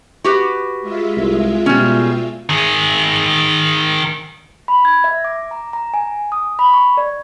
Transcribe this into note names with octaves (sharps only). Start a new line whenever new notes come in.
F#4 G4 B4
G#3 F4 E5
C2
B2 G3 C#4
D#3 G#4
B5
G#6
E5
D6
A#5
A#5
G#5
D#6
B5
C#6
D5